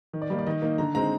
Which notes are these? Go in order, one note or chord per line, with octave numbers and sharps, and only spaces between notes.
D#3
D5
G3 A#3 D#4
D5
D#3 D#5
A#3 D#4
D3 A#5
G#3 C4 D#4 A#5